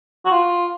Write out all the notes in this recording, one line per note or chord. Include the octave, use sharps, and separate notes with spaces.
F#4
F4